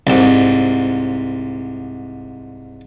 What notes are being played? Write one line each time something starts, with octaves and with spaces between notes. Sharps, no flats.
C2 G#2